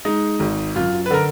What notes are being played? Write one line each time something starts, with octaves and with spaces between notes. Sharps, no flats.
G#3 D#4
G#1
F#2 F4
B4
D3 A#4